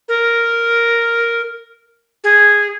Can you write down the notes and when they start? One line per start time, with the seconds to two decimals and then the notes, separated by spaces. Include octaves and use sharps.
0.09 A#4
2.24 G#4